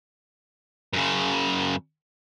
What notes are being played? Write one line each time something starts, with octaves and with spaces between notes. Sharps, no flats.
F#2 C#3